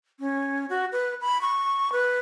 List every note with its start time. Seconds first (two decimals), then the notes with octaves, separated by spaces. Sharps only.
0.20 C#4
0.70 F#4
0.92 B4
1.21 B5
1.41 C#6
1.92 B4